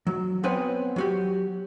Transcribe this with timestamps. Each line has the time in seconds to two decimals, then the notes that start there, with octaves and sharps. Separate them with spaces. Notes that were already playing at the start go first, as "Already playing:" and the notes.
0.07 F#3
0.43 B3 C4 B4 C#5 F#5 G#5
0.96 F#3 F#4 G4